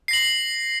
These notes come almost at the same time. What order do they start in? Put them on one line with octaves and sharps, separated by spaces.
C7 A#6 F#7